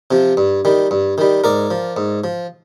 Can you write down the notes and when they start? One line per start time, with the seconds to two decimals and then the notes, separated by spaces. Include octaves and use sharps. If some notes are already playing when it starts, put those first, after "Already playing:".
0.11 C3 F3
0.37 G2
0.65 D#3 G3
0.91 G2
1.18 D#3 G3
1.44 G#2 A#4 D5
1.71 F3
1.97 G#2
2.24 F3